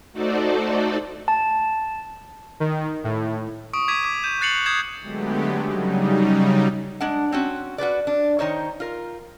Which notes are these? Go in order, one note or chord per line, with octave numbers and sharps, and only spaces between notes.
A3 D#4 F#4 A4 C5 D5
A5
D#3
A2
C#6 D#6 D7
D6 G#6 B6 D#7
D6 B6
G6 D#7 E7
F#6 A6 C7 C#7 F7 F#7
D#6 G6 G#6 C7 E7
D3 F#3 G#3 A3 B3 G4
C#3 F#3 G3 D#4
G#3 D4 F#5
C4 C#4 F#4
F#4 G#4 B4 D5
D4
D#3 D#4 C5 C#5
F4 A#4